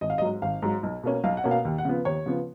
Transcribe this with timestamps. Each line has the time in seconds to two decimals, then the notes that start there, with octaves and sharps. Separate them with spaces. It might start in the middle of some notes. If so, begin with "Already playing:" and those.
0.01 G#1 D#5
0.10 F5
0.18 D#5
0.21 G#2 F#3
0.42 G#1 F5
0.62 G#2 F#3
0.83 B1
1.03 B2 A#3 C#4
1.24 B1 F5
1.37 F#5
1.44 B2 A#3 C#4
1.51 F5
1.65 D#2
1.78 F#5
1.85 C#3 F3 B3
2.05 D#2 C#5
2.26 C#3 F3 B3